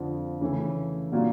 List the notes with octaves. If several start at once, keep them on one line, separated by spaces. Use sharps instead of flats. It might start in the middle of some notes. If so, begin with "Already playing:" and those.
Already playing: F2 D3 F3
C#3 E3 A3
A#2 G3 A#3 D4 F#4